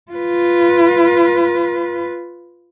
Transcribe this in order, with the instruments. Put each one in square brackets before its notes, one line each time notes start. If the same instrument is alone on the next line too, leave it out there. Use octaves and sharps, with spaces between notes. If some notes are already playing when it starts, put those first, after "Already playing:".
[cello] F4 B4